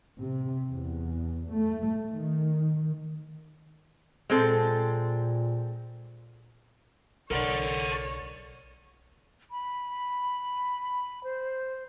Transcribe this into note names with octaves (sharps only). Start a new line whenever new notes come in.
C3
E2
A3
D#3
A#2 G#3 C4 A4
B1 A4 A#4 C#5 D5 F#5
B5
C5